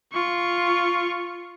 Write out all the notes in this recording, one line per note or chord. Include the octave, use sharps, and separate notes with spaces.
F4 C#6